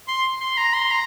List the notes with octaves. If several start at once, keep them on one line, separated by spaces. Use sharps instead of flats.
C6
C6
A#5
C6
A#5